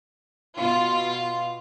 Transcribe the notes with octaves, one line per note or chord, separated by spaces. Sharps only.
B2 F4